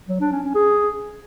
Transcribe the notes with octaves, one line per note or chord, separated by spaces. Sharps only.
F#3
D4
C#4
C#4
G#4